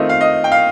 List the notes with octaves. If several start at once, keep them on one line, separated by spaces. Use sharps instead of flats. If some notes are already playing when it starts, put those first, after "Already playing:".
Already playing: D#3 A3 C4 F4 D#5
F5
D#5
G5
F5